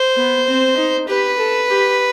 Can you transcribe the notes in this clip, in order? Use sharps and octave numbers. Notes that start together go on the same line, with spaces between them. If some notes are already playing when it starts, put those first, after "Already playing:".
Already playing: C5
B3
C4
D#4
G4 B4
A4
G4